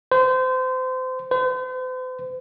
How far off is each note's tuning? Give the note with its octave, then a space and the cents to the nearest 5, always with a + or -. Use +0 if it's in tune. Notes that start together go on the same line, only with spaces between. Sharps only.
C5 -30
C5 -45